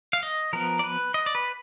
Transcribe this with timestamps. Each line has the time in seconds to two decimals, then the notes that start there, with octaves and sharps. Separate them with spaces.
0.13 F5
0.23 D#5
0.53 F3 B3 A#4
0.79 D5
0.84 B4
1.14 D#5
1.26 D5
1.35 B4